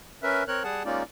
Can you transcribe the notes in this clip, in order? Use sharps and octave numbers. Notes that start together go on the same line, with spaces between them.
C#4 A#4 B4 E5
C4 A#4 C#5 F#6
G3 G#4 F#5 A5
G#3 A#3 C#4 D#4 F4 D5